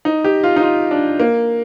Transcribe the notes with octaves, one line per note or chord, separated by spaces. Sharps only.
D#4
G4
F4
D#4
F4
D4
A#3